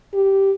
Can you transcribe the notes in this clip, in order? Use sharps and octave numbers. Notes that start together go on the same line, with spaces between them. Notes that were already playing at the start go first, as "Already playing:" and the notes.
G4